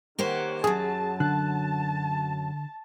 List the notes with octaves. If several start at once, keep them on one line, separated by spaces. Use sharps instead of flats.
D#3 A#3 G4 C5 C#5 F#5
F#2 F#3 G#4 A5
D3 A5 F#6